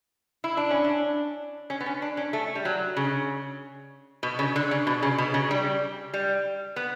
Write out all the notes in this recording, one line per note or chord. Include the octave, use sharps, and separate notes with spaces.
E4
D4
C#4
D4
C#4
B3
C#4
D4
C#4
A3
G3
F#3
C#3
B2
C#3
D3
C#3
B2
C#3
B2
C#3
G3
G3
B3